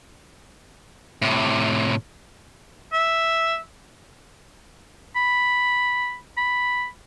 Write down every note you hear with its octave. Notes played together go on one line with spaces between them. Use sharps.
A2 C3
E5
B5
B5